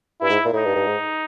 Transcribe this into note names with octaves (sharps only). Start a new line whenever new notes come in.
G2 E4
G#2
A#2
A2 D#4
G2
G2
G#2